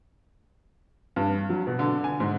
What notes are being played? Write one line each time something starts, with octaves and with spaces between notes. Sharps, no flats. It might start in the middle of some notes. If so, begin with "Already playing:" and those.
G2
F#3
B2
D3
G#5
G#2